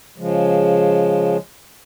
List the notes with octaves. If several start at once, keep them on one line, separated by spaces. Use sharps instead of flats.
C#3 F3 G#3